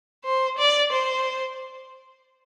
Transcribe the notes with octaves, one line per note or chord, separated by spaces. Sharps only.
C5
D5
C5